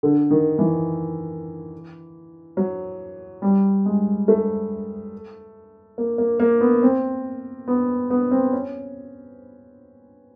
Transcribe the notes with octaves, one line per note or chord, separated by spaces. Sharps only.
D3
D#3
E3
F#3
G3
G#3
A3
A#3
A#3
A#3
B3
C4
B3
B3
C4
C#4